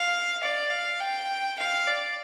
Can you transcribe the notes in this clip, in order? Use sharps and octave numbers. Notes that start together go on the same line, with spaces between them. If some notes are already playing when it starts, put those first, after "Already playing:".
Already playing: F5
D5
F5
G5
F5
D5